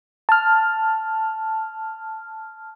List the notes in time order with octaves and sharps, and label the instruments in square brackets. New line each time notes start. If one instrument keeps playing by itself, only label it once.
[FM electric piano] A5 F6